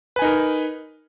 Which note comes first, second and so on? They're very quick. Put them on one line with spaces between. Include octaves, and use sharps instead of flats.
B4 G#5 D#4 A#4